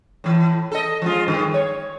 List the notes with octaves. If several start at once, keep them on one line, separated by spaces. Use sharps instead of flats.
A2 E3
A4 D#5
F3 G#3 F4
G2 D#3 G#3
C#5